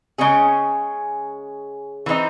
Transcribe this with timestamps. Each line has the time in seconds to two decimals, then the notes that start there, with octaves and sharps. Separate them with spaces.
0.18 C#3 G#3 C#4 G#4
2.06 E3 C4 D#4